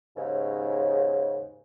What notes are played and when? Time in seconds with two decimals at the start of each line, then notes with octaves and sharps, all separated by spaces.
0.17 D#2 G#2 C#3